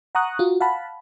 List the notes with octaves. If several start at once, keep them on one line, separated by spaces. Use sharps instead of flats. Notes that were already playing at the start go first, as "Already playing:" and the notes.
F#5 A#5 C#6 D#6 F#6
F4 F#4
F5 F#5 A5 B5